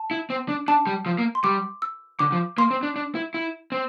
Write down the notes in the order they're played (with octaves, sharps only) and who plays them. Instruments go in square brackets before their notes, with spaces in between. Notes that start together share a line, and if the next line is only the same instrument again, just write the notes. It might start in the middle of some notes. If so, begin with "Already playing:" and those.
Already playing: [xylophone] A5
[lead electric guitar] E4
C4
D4
[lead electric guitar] D4 [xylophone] A5
[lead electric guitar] G3
F3
A#3
[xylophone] C6
[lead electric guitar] G3 [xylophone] D6
[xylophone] E6
[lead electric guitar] D3 [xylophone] D6
[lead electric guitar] F3
[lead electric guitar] A#3 [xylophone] C6
[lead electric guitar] C4
D4
D4
E4
E4
C4